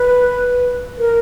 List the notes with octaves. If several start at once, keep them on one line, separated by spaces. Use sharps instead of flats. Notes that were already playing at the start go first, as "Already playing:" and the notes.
Already playing: B4
A#4